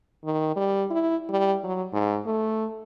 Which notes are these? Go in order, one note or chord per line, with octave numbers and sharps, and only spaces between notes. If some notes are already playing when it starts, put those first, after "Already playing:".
D#3
G3
E4
G3
F#3
G#2
A3